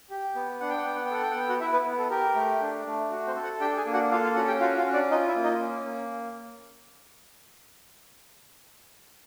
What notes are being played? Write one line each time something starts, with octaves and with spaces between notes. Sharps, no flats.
G4
B3
D4 F#5
G5
F#5
B3 G5
F#5
G5
A4 F#5
G5
F#5
B3 G5
F#4 F#5
E4 E5
B3 B4
B3
A4
G4 A#4
A3
D4
A3
F#4
C4 C5
A4
F#4 F#5
D4 G4 G5
G#4 G#5
A#3
F#4 F#5
F4 A4 F5
F4 F5
C#4 F#4 F#5
G4 G5
F4 F#4 F5
F4 F5
C#4
D4 D5
D#4 F4 D#5
E4 E5
A#3
D#4 D#5
C#4
A#3